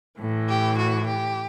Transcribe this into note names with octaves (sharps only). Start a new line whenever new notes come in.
A2 E3
G4
F#4
G4